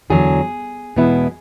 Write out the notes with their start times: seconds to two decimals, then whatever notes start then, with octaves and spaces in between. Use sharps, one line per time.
0.10 E2 D3 F#3 G#4
0.96 E2 B2 G#3 B3 E4